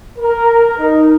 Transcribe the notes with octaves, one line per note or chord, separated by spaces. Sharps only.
A#4
D#4